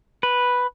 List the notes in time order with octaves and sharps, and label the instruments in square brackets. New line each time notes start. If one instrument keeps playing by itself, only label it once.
[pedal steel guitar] B4